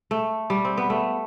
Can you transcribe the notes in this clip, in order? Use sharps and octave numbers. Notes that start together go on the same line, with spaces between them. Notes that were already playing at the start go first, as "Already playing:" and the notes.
A3
G3
C4
B3
A3